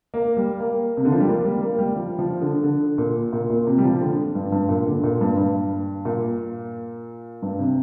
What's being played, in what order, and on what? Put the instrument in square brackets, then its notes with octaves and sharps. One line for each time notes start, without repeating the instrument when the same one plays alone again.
[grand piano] A#3
G3
A#3
C3
D3
F3
G3
A#3
G3
A#3
G3
F3
F3
D3
D3
A#2
A#2
A#2
C3
G3
F3
D3
G2
G2
A#2
D3
A#2
G2
G2
A#2
G2
C3